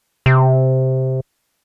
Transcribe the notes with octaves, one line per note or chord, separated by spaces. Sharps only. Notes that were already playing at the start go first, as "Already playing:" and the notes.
C3